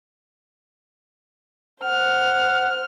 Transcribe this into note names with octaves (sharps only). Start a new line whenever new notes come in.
C5 F#5 F6